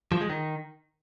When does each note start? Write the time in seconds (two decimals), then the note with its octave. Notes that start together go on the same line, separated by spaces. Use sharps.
0.12 F3
0.21 G#3
0.30 D#3